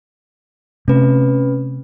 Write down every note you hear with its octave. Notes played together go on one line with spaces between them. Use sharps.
C3 A3 C#4 B4